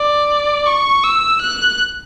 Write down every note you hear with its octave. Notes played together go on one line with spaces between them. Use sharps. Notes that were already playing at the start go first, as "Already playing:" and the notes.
Already playing: D5
C#6
E6
F#6